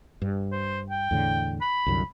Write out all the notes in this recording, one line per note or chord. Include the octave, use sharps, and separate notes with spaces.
G2
C5
G5
E2 A2 D3
B5
C2 F#2 D3